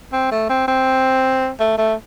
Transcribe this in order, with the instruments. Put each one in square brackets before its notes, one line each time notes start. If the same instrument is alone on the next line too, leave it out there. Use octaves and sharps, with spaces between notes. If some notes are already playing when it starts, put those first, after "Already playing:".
[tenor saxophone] C4
A3
C4
C4
A3
A3